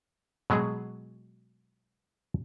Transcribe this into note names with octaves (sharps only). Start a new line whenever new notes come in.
B2 F#3 G#3 G#4